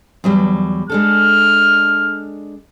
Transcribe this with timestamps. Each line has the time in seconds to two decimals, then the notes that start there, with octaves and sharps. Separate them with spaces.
0.24 E2 F#3 G3
0.89 G#3 D4 A4 F6